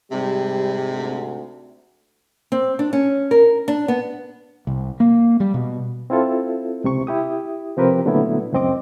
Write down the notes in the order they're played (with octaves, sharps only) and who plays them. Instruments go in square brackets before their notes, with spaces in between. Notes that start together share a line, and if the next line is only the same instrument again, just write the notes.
[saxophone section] G#2 C3 [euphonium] G3
[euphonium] D2
[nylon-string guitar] C4
D4
C#4
A#4
D4
B3
[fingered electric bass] C2
A#3
G3
B2
[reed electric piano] C4 E4 F4 A4
C#2 C3 C#6
E4 G4 D#6
C3 F3 C4 G4 A#4 B4
A#2 D3 F#3 A3 B3 E4
C#2 F#2 C4 D#5 D6